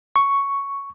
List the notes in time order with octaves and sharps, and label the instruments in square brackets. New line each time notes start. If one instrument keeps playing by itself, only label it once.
[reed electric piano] C#6